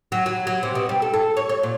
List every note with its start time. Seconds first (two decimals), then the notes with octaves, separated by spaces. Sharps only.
0.12 F#3
0.26 F#3
0.47 F#3
0.63 C3
0.75 B2
0.89 G3
1.02 A4
1.14 A4
1.37 C#5
1.49 C#5
1.63 A#2